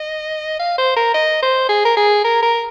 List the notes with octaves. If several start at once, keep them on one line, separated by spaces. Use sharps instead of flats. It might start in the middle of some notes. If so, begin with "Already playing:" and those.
Already playing: D#5
F5
C5
A#4
D#5
C5
G#4
A#4
G#4
A#4
A#4